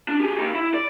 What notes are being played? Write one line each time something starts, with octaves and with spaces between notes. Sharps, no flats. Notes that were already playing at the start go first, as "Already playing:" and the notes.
D4
G4 G#4
D#4 G4
E4
D5